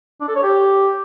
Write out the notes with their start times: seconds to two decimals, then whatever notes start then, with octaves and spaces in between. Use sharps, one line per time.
0.21 D4
0.28 A4
0.36 C#5
0.43 G4